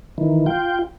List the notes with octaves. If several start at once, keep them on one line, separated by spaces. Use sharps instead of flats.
D#3 E3
F4 G5